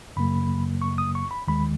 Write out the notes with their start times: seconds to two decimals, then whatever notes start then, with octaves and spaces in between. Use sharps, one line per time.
0.16 F#2 C#3 F#3 A#3 B5
0.82 C#6
0.98 D#6
1.15 C#6
1.31 B5
1.47 D#2 D#3 G#3 B5